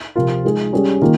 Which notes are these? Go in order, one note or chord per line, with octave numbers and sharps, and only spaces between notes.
C3 F3 C4 F4 A#4
G#3 D#4 G#4
G3 C#4 G#4
D#3 A#3 F4